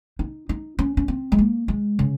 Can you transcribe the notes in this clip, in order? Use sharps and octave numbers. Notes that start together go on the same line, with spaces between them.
D#4
D#4
C#4
C#4
C4
G#3
A#3
G#3
C#3